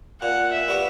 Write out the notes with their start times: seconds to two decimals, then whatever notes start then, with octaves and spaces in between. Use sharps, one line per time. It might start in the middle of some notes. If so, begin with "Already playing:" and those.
0.21 A#2 F#5
0.52 E5
0.68 G3 B3 F#4